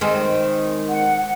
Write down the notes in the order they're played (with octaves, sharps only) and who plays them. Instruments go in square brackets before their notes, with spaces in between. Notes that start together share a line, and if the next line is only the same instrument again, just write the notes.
[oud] D#3 G#3 C4
[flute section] F#5